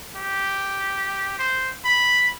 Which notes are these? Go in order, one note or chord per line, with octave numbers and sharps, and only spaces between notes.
G4
C5
B5